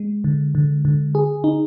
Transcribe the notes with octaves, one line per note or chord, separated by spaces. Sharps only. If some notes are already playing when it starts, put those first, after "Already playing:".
Already playing: G#3
D3
D3
D3
G#4
D#4